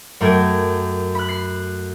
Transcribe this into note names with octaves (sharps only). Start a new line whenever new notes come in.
F#2 A3 A#4 G5 D6 G#6
B5 F#6
C7